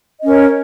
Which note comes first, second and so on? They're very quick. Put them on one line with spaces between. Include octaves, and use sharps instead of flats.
D#5 C#4 A#4 C#5